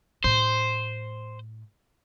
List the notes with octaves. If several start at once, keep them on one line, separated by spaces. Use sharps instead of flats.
A2 A3 C5